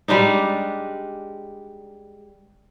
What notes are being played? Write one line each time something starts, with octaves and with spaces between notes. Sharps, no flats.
G3 G#3 D4 D#4